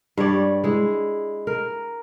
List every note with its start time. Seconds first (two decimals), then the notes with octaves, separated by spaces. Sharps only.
0.17 G2 G3 C#5 D5
0.64 G#3 E4
1.47 A#4